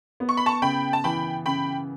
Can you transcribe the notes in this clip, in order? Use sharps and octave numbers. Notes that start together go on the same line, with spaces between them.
B3
C#6
B5
A5 C#6
C#3 G5 B5
A5
E3 G5 B5
C#3 G5 B5